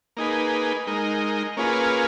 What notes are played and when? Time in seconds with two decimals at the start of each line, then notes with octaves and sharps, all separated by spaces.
0.17 A#3 D#4 G#4 B4
0.87 G#3 D#4 A#4
1.57 A#3 C#4 F4 G#4 B4